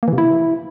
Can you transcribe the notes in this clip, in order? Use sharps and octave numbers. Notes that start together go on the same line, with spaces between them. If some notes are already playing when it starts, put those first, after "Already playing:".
A#3
E3
C3
E4